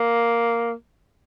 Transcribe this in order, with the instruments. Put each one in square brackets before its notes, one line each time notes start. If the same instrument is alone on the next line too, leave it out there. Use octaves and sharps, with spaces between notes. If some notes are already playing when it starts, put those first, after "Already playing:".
Already playing: [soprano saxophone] A#3